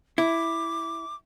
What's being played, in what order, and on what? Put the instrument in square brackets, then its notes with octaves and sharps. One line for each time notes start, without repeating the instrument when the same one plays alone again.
[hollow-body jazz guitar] E4 [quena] D6